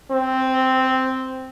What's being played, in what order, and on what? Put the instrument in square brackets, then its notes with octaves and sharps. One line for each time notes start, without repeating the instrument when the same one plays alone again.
[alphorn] C4